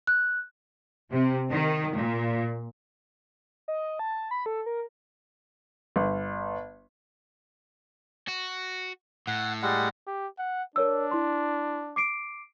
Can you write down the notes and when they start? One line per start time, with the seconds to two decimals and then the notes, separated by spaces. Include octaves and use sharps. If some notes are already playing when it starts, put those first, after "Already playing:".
0.07 F#6
1.11 C3
1.51 D#3
1.96 A#2
3.68 D#5
3.99 A5
4.31 B5
4.46 A4
4.66 A#4
5.96 G1
8.28 F#4
9.27 A2 F#5
9.62 G3 G#3 F#5
10.07 G4
10.39 F#5
10.76 D4 A#4 C#5 E6
11.11 E4 C6
11.96 D6 C7 D7